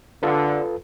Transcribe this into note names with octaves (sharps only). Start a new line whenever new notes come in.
D3 F4 A4 B4